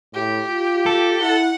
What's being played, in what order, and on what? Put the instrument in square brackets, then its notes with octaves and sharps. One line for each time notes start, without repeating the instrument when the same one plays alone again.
[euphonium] A2 [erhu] G4
[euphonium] F4
[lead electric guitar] A4
[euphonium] E4 [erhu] F#5